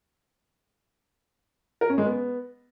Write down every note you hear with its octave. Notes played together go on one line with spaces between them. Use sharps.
A#4
C#4
G#3
B3